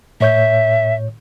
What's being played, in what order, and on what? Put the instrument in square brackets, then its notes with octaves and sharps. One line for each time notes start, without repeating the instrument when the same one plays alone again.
[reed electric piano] A2 C#5 G6 [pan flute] E5